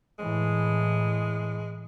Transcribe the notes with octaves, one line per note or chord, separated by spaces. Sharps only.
A2 E3 G#3